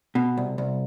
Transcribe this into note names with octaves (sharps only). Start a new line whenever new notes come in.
B2
C2
C2